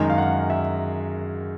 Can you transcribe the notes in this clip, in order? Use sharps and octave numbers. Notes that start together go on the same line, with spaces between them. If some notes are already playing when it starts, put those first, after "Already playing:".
Already playing: F#2 D#3 G#3
F5
F#5
E5